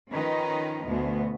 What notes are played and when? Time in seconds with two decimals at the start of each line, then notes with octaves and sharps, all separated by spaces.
0.12 D#3 F3 C#4 D#4 B4 D#5
0.87 D2 B2 B3